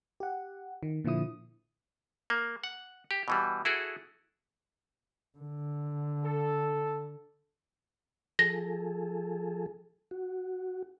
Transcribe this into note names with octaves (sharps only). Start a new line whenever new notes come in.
G4 F#5
D#3
A#2 D3 F3 E4 D#6
A#3
F#5
G4
B2 E3 G3
E4 F#4 G#4 A4
D3
A4
F3 G#4 A4 A#6
F#4